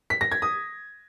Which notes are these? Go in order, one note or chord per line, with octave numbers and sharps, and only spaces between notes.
B6
A#6
G#6
D#6